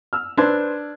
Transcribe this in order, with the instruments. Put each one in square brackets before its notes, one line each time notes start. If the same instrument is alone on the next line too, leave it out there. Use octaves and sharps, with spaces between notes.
[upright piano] E6 F6
[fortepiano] D4 [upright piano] B4 C5 G#6